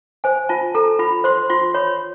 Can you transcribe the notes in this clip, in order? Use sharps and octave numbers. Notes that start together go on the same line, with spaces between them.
C5 G#5
F4 A5
A4 A#5
F4 B5
C5 C6
F4 C6
C#5 B5